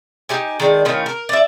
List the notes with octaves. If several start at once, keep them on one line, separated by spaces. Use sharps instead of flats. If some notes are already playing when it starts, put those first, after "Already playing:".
D#4 G4 G#5
D#3 G#3 D4
A2 D#3 C#4 F4
A#4
D5 E5